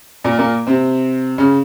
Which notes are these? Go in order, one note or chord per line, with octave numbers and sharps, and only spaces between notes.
A#2 A#3
A#2 A#3
C3 C4
C#3 C#4